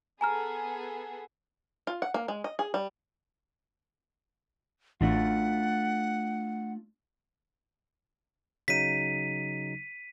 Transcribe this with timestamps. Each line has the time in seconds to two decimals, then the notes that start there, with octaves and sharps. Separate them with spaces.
0.21 B3 G#4 A4 G#5 A#5 F6
1.87 F4
2.02 F#5
2.14 A#3
2.28 G#3
2.44 D#5
2.59 G#4
2.74 G3
5.01 A1 A3 D4 F4 F#5
8.68 C#3 F#3 D#4 B6 D#7